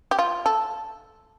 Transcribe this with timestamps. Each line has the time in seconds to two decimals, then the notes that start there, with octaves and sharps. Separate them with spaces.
0.11 G4
0.19 F4
0.46 A4